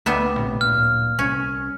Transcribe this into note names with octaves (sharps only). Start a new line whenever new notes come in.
D2 G3 B3 E5
A#1 A2 C3
D1 A#2 F6
C2 C#4